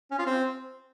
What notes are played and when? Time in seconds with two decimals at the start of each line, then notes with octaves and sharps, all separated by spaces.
0.11 C#4
0.19 F4
0.26 C4